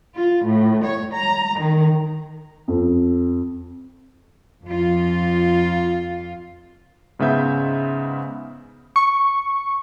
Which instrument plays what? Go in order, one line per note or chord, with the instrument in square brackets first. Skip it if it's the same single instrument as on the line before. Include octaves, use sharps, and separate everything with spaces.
[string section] F4
A2
C#5
A#5
D#3
[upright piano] F2
[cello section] F2 F4
[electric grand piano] G#2 C#3 B3 E5 G6
[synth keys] C#6